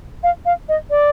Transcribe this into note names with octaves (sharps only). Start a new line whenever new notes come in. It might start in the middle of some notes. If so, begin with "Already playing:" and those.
F5
F5
D#5
D5